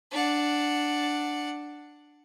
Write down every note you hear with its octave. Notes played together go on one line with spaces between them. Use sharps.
D4 F#5